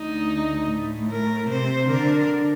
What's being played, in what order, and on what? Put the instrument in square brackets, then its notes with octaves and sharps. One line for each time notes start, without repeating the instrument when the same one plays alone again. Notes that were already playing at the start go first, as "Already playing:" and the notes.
Already playing: [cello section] D2 D3 [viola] D#4
[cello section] A2 A3
[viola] A#4
[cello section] C3 C4 [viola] C5
[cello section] D3 D4 [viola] A#4